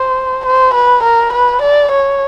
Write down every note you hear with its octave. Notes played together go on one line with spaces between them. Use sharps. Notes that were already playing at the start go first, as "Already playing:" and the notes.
Already playing: C5
C5
B4
A#4
B4
D5
C#5